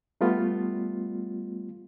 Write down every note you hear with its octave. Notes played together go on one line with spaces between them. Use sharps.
G3 A3 B3 F4